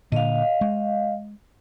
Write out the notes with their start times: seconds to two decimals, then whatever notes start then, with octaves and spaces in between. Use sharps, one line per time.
0.12 A#2 D3 D#5 F5
0.61 G#3